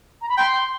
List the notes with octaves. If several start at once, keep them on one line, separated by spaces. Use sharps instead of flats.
A#5
B5
G5 C6